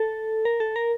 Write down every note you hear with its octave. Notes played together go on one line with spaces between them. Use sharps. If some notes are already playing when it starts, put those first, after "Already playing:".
Already playing: A4
A#4
A4
A#4